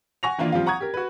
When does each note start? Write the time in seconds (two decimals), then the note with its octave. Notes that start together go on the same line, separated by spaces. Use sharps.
0.23 F#5 G#5 C#6 A#6 F7
0.38 D#3 E3 A#3 D4 F4
0.52 F3 G3 C4 F4
0.66 F#5 A#5 C#6 D#6 G#6
0.80 G4 A#4
0.94 F#4 B4